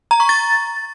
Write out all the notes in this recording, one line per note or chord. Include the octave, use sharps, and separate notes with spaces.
A#5
C#6
A6